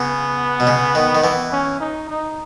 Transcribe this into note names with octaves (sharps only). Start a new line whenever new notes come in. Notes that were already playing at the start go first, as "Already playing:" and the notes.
Already playing: C#3 B3
B2
C#3
D#3
D#3
E3 B3
C#4
D#4
D#4